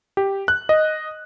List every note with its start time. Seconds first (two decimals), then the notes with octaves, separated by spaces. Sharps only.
0.17 G4
0.48 F#6
0.69 D#5